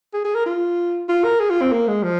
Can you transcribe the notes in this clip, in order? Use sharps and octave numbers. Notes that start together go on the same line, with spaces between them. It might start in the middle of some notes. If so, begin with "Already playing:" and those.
G#4
G#4
A#4
F4
F4
A#4
G#4
F4
C4
A#3
G#3
F3